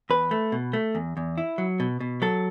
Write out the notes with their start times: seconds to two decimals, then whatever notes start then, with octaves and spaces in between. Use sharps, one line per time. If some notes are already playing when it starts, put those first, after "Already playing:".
0.10 E2 B4
0.31 A3
0.52 B2
0.73 A3
0.95 E2
1.17 E2
1.38 E4
1.58 F#3
1.80 B2
2.00 B2
2.22 F#3 A4